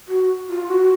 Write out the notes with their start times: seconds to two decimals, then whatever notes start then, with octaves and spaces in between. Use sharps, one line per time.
0.08 F#4
0.48 F4
0.67 F#4